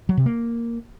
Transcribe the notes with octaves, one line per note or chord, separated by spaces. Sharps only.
F#3
C3
A#3